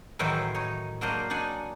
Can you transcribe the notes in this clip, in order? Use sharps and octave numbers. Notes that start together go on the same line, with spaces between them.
A2 D#3 E3 F#3 C5
D#4 C#5
F#3 A#3 D4 C5 D#5
D4 D#4 F#5 G#5